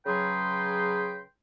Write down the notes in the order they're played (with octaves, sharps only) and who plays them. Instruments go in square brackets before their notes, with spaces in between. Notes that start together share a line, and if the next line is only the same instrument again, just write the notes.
[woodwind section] C#3 F#3 G#4 B4 G5 C6